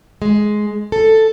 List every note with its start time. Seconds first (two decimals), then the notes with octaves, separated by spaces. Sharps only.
0.22 G#3
0.92 A4